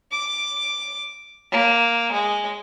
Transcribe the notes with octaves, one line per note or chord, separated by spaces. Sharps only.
D6
A#3
G#3